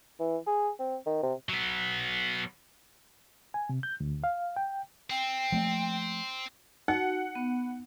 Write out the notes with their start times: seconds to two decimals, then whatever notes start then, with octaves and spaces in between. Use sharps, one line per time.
0.20 E3
0.47 G#4
0.79 C4
1.06 D#3
1.23 C3
1.49 F#3 B3
3.54 G#5
3.69 C3
3.83 G6
4.00 D2
4.24 F5
4.56 G5
5.10 C4 G5
5.52 F3 A3 A#3
6.88 D#4 F#4 F#5
7.35 B3